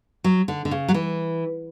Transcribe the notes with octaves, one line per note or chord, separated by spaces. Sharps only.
F#3
D3
D3
C#3
F#3
E3